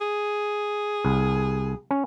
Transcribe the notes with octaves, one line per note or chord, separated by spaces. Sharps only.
G#4
C2
C#4